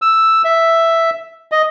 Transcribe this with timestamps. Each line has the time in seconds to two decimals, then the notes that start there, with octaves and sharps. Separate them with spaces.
0.02 E6
0.45 E5
1.52 D#5